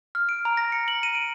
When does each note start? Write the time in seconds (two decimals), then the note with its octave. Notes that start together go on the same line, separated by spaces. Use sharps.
0.15 F6
0.29 D7
0.45 A#5
0.57 A#6
0.72 C#7
0.88 F#7
1.03 D#7
1.15 D7